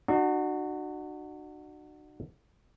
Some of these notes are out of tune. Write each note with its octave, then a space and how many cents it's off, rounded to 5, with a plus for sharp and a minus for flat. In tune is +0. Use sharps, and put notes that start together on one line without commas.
D4 +45 F#4 +0